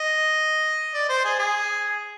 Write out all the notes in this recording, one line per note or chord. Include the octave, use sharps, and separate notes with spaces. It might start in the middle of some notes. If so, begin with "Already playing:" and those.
Already playing: D#5
D5
C5
G#4
G#4